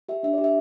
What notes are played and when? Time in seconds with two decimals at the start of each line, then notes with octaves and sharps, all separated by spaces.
0.09 G4 E5
0.23 D4 E5
0.33 D5
0.38 G4
0.44 E5